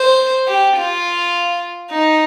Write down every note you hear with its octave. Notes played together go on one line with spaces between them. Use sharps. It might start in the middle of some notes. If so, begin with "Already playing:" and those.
Already playing: C5
G4
F4
D#4